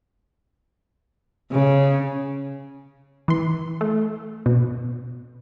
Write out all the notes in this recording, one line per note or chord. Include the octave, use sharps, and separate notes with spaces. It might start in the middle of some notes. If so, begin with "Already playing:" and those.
C#3
E3 C6
A3
B2